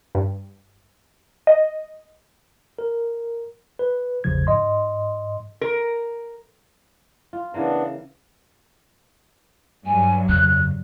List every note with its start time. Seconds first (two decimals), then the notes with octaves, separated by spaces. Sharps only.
0.15 G2
1.47 D#5
2.79 A#4
3.79 B4
4.24 A1 E2 C#3 F3 G#6
4.47 G#2 D#5 C6
5.61 A#4
7.33 F4
7.54 C#3 E3 A#3 B3 D4
9.86 G2 F#3 G#5
10.29 F2 C#3 F#6